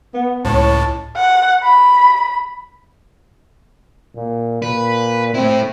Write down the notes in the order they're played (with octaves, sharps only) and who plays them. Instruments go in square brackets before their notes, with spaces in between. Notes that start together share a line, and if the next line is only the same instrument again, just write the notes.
[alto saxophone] B3
[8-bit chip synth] C#2 A2 [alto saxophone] C#5 [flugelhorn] A5
[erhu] F#5
B5
[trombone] A#2
[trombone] A#2 [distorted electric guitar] B4
[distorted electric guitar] A3 E4 [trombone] C4